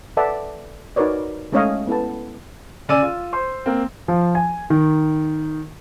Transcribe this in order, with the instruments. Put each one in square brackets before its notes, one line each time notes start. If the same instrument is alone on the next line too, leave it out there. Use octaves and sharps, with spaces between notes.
[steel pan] A4 B4 D5 E5 F#5 A5
D#4 F#4 A#4 B4 C#5 D5
G#3 A3 C#4 C#5 D#5 F5
B3 E4 A4 B4 A5
[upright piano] C#3 D5 G#5 E6 D#7
F4
C5 C6
A#3 C4
[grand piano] F3
G#5
D#3